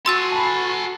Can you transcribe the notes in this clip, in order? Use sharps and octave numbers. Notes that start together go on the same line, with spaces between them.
F#4 A4 G#5 C6 E6 A6
A5 B5